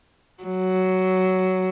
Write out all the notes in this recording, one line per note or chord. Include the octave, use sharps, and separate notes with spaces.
F#3